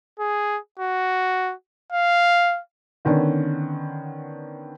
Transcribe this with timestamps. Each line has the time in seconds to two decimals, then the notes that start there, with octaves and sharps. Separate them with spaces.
0.20 G#4
0.79 F#4
1.92 F5
3.05 D3 D#3 B3 C#4 D4